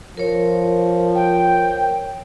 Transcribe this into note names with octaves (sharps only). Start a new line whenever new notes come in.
F3 A#4 C#5
G5